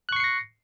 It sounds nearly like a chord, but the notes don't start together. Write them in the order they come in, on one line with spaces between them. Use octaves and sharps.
F#6 C#6 C7 C#7 A#6